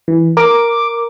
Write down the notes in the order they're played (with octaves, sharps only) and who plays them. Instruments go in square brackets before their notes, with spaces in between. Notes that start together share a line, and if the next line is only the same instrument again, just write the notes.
[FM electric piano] E3
[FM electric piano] A#4 [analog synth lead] D6